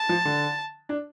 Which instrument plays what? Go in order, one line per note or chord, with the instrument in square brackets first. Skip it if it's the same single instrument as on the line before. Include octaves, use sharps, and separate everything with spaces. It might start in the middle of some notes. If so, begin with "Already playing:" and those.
Already playing: [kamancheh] A5
[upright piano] F3
D3
D4